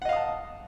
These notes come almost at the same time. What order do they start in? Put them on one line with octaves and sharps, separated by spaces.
F#5 D#5 F5 D#6 A5